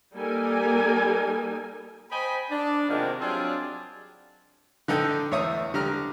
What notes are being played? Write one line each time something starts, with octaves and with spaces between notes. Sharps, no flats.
G3 A#3 D#4 A4 A#4 G#5
C5 D#5 G5 G#5 B5
D4
C3 D#3 F3 G#3 A#3 B3
F#3 G3 C4 D4 F4 G#4
D3 D#4 A4 G5
E2 A3 C#5 E5 D#6
D3 G4 A#5 F6